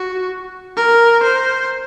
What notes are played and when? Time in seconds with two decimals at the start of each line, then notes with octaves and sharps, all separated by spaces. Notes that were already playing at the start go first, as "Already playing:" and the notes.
Already playing: F#4
0.77 A#4
1.23 C5